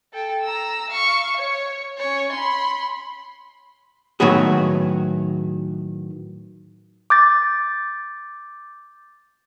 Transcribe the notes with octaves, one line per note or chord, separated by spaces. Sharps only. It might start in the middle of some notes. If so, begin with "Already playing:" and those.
A4 G5
A#5 E6
F5 C#6
C#5
C#4 C#5
B5 C6
A2 D#3 F#3 B3 F#4 G#4
D6 G6 A6